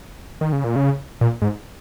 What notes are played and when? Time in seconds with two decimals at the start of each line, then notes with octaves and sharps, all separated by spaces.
0.41 D#3
0.53 C#3
0.64 A#2
0.76 C#3
1.21 A#2
1.42 G#2